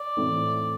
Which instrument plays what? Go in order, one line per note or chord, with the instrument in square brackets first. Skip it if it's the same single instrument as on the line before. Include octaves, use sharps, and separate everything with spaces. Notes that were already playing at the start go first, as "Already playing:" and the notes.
Already playing: [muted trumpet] D5
[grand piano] A2 E3 A3 C4 E4